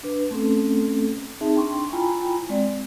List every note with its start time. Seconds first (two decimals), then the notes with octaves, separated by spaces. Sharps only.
0.03 D4 B4
0.31 A3 C4 C#4 A4
1.41 C4 D#4 G#4 E5 A5
1.55 D4 G5 C6 C#6
1.92 E4 F4 G5 G#5 A#5 B5
2.49 G#3 C4 D5